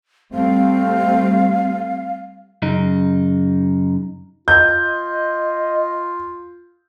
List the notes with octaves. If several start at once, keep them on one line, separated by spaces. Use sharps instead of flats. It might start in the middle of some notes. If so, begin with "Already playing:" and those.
G3 A3 C4 F5
F#2 C#3 D#4
F4 D#5 G6